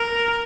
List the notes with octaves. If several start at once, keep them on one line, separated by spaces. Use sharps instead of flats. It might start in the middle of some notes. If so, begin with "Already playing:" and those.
Already playing: A#4